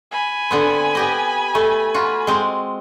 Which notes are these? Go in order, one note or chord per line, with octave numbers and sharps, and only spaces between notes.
G#5 B5
D3 B3 C4
B3 G4 D#5
A3
F4 F#4
G#3 C4